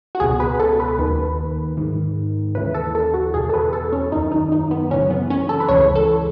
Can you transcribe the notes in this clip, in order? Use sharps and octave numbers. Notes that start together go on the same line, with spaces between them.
F#4
C#2 B2 G#4
B4
A4
B4
D#2 D#3
G#2 D#3
D#2 C#3 E3 B4
A4
A4
F#4
E2 B2 G#4
A4
B4
A4
C#4
F#2 D#3 D#4
D#4
D#4
B3
F#2 C#3 E3 C#4
B3
C#4
A4
B4
C#2 C#3 E3 C#5
A4